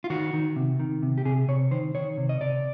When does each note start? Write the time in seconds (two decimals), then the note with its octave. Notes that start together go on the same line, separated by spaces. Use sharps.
0.04 F4
0.10 D#3 F#4
0.33 D#3
0.56 C3
0.80 D#3
1.03 C3
1.18 G4
1.25 C3 G#4
1.48 C3 C#5
1.71 D#3 C5
1.95 D#3 C#5
2.17 C3
2.29 D#5
2.41 C3 D5